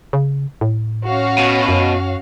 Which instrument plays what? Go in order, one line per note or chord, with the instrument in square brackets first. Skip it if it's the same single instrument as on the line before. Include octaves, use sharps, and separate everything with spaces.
[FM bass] C#3
A2
[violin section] C#4 F#4 F5
[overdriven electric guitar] B2
[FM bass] F#2